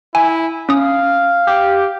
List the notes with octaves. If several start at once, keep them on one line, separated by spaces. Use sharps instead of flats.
E4 G#5
C#4 F5 D#6
G4